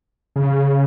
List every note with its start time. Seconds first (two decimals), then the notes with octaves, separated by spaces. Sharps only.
0.36 C#3